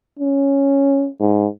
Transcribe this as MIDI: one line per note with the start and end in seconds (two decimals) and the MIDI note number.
0.19 1.08 61
1.20 1.47 44